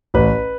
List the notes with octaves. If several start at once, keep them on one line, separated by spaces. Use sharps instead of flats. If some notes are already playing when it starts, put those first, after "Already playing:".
A1 B4